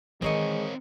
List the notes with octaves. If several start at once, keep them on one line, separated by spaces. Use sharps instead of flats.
D#3 E3 G#3 C4 D#4 A#4 C#5 D#5